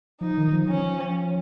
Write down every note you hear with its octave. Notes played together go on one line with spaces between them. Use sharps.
F3 D#4
D#3
F3
F3 C#4